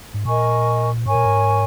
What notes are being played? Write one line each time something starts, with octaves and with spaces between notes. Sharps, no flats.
G#2
A#2 A#4 D#5 G#5 C#6
G#2 A#4 C#5 G#5 C#6
A#2
G#2